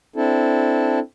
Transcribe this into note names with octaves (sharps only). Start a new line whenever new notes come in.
C4 D4 E4 A4